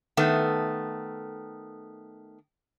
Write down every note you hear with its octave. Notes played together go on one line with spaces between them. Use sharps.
D#3 A3 B3